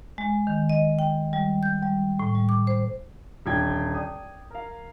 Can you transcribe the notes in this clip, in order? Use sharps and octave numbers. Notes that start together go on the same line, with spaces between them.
G#3
D#3
D#5
G5
G3
G6
G3
A2
G3
D6
C5
D#1 D3 D4 F4 G5 G#6
D5 G5 D#6
A#4 F5